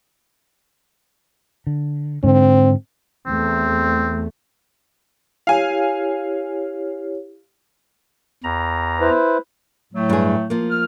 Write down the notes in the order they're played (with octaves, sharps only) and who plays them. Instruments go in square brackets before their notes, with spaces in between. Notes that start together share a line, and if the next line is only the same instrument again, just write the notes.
[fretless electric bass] D3
[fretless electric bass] G#2 D3 [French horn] C4
[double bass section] E2 A3 [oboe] C4
[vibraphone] E4 G4 C#5 [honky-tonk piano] F5 G#5
[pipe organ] E2 A#5
[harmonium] E4 B4 C5
[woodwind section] A2 F#3 A3
[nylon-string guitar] G2 G#4
F3 A#3
[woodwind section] F6